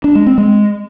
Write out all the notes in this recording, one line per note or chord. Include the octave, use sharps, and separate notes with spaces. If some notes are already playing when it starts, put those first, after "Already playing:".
D4
G#3
C4
G#3